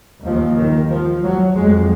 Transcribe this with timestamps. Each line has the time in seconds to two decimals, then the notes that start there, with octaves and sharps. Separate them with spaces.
0.24 D#2 F3
0.57 D#3
0.90 F3
1.23 F#3
1.55 F2 G#3